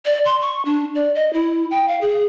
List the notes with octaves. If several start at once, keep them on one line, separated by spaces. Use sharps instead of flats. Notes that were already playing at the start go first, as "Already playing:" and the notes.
D5
C6
C#6
D4
D5
D#5
E4
G5
F5
G#4